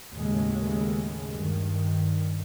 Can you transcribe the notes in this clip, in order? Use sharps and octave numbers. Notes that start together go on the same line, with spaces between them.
D#2 A2 C#3 G#3
G2 D#3